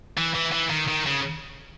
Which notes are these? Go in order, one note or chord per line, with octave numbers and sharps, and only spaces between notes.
E3
E3
E3
D#3
D#3
C#3